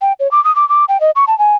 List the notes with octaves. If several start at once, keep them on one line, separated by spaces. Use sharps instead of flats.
G5
C#5
D6
D#6
D6
D6
G5
D#5
C#6
A5
G#5